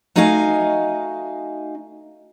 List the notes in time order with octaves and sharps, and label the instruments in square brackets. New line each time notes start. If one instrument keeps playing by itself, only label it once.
[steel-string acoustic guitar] A3 D#4 F#4 D#5 F5 G#5